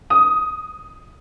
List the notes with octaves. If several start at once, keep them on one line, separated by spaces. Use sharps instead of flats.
D#6